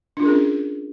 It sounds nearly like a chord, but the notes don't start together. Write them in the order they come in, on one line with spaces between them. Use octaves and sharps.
D4 F4 A#4 G#4 C#4